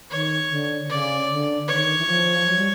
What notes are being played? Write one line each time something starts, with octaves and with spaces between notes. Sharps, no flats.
D#3 C#5
D3
C#3 D5
D3
D#3 C#5
E3
F3
F#3
G3